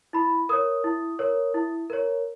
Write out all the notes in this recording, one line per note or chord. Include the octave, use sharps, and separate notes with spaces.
E4 B5
A#4 C#5 D#6
E4
A#4 C#5
E4
A#4 C#5